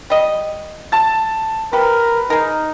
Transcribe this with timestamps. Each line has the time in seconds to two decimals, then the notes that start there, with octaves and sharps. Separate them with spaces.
0.10 G3 D#5
0.92 A5 A6
1.73 G4 A#4 B4
2.30 D#4 G#4 A#4